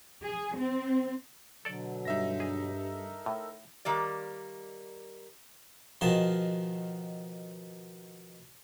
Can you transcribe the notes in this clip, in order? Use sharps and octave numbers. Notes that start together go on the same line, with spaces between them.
G#4
C4
B2 D3 F#3 A4 D5
G2 D#4 E5 A#6
G#4
A4 A#4
A2
D#3 G3 A#3 D5
B2 D#3 F3 G#4 A5